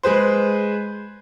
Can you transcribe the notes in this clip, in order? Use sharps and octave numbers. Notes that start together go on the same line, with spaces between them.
G#3 G#4 B4 C5